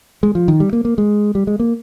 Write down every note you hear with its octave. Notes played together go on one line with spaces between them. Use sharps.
G#3
F3
D#3
G3
A#3
A#3
G#3
G3
G#3
A#3